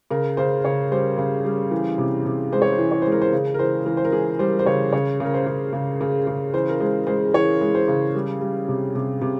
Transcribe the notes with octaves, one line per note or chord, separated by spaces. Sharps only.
C#3 A#4
C#3 C5
C#3 C#5
G3 C5
C#3
G3
E3
C3
C3
G#3 C5
C#5
C5
E3
C#5
G#3 C5
A#4
C5
C#3
A#4
E3 C5
E3 A#4
C5
A#4
E3 G#4
G3 C5
C5
C#3 C#5
C#3 C#5
C#3 A#4
C5
C#3
C#3
C#3
C#3
E3 C5
A#4
G#3 C5
G#3 C5
E3 C#5
G#3
C5
C#3
G3
G3
C3
C3
C3